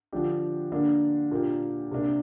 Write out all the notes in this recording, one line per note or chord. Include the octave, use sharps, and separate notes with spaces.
D3 F3 D4 G4
D3 A#3 D4 G4
A#2 A#3 D4 G4
C3 A#3 D4